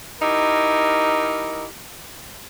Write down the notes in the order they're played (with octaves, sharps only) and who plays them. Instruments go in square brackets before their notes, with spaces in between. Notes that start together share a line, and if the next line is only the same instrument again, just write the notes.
[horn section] D#4 E4 G4 A#4